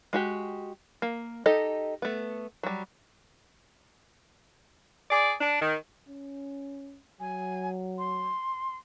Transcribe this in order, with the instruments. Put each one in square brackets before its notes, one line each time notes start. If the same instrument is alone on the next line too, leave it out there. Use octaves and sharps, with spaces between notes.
[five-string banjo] G#3 F#4 G4
A#3
D#4 G4 A4 D#5
A3 B3
F#3 G3
[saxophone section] G#4 D5
D4
D#3
[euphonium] C#4
[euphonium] F#3 [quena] G#5
[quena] C6